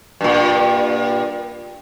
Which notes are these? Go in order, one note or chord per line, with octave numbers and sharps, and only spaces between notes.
G2 A#2